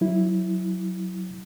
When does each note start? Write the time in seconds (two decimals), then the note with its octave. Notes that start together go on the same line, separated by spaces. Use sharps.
0.01 F#3 E4